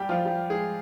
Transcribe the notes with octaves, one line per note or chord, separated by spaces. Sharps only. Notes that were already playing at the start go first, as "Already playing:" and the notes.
Already playing: G3 G4
F3 F4
G3 G4
G#3 G#4